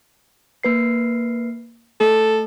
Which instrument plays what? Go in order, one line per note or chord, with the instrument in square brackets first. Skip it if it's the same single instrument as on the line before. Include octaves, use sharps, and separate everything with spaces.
[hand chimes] A#3 B4 C7
[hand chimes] A3 [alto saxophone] A4